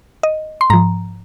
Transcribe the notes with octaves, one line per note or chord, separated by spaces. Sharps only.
D#5
C6
G#2 F3 A#5